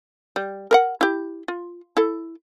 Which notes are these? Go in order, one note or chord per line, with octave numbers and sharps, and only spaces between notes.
G3
A#4 B4 F#5
E4 G4
F4
E4 A4